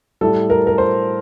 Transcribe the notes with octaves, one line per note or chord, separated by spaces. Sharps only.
A2 G3 A4
A#4
A#4
C5